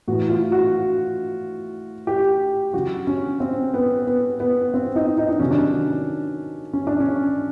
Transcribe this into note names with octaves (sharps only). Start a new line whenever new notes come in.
A2 E3 F#4
F4
F#4
G4
C#3 F#3 F#4
C#4
C4
B3
B3
B3
C4
D#4
D#4
D4
C3 D#3 F#3 C#4
D4
C#4
D4
C#4